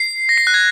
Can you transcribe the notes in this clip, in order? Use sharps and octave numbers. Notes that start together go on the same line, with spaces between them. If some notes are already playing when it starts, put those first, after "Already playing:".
Already playing: C7
A#6
C7
F#6
G#6